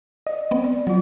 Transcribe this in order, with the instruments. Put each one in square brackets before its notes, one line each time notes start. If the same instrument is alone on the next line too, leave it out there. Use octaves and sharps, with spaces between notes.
[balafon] D5 [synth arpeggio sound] D#5
[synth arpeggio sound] B3 C4
[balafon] D5
[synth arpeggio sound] F#3 [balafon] F4 D5